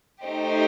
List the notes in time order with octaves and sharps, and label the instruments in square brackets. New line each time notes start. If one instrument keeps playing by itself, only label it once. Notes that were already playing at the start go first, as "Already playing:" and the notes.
[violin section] A3 D#4 G4 C5